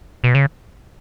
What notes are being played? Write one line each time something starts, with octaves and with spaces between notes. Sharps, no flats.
B2
C#3